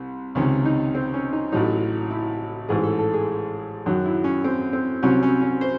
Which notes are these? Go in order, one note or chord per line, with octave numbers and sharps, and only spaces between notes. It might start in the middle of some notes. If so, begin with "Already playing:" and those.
Already playing: C2 C3
C#2 C3 D#3 C#4
D#4
C4
C#4
D#4
A1 A2 F#3 D#4
E4
A1 G#2 E3 G#4
A4
A4
G#4
F#2 D#3 F#3
E4
C#4
C4
C4
C2 C3 F#3 C4 C#4
C#4
C#4
C5